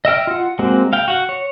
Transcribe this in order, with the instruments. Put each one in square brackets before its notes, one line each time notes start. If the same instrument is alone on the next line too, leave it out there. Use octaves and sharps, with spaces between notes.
[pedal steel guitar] D#5 E5 G5 F6
F4 F#5
G#3 A#3 C4 F#4
F5 G5
F#4 F#5
C#5